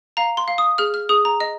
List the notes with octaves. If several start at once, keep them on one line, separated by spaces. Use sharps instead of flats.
F5 A#5
C6
F5
D#6
G#4 F6
F6
G#4 D#6
A#5
D#5